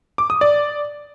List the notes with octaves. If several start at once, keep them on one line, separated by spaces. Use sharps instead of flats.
D6
D#6
D5